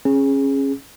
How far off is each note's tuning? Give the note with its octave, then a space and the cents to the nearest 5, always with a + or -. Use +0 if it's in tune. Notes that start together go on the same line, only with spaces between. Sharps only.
C#4 -20 G#4 +0